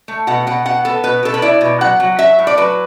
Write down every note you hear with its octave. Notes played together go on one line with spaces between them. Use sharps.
A3
B2 F#5
B2 F#5
B2 F#5
B3 A4
B2 B4
B2 A4
B4
E4 D5
B2
F#3 F#5
F#3
F#3 E5
A2
D5
F#3 B4